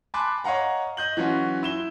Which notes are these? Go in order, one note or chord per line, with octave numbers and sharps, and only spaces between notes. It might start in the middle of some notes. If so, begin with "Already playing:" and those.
G#5 A5 B5 C6 D6 F#6
C#5 D#5 F5 F#5 A#5
D#5 G6 F#7
E3 F#3 C#4 F4 F#4
E4 E7 G7